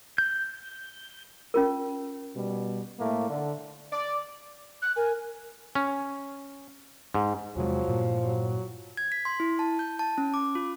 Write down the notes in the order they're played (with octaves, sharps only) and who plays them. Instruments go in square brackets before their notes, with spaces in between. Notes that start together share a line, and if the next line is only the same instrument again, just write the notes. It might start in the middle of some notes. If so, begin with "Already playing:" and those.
[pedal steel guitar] G6
[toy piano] C#4 F4 A#4
[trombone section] B2 G3
A2 A3 A#3
D3
[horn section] D5
[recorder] F#6
[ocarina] A#4 [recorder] G#5
[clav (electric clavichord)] C#4
G#2
[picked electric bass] E2 C3 G#3 [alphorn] F3 [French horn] F#3
[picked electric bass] G2 A#2
[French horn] F#3
[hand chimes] G#6
B6
C6
E4
A5
G6
A5
C#4
D6
F4